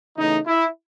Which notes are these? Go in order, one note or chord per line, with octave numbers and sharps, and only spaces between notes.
C#3 E3 A3 D#4
E4